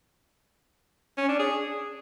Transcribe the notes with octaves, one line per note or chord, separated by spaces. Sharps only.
C#4
D4
G#4